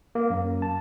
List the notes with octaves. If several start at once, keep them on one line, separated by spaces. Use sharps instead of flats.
A#3
F#2
A5